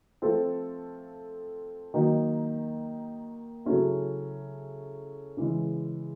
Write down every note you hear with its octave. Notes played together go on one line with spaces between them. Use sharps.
F3 A3 C4 F4 A4
D#3 F#3 A#3 D#4
C#3 F#3 A3 C#4 E4
C#3 E3 G#3